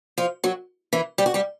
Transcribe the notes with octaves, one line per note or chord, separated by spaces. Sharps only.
F3 F4
F#3 F#4
E3 E4
G3 G4
F#4
G3 G4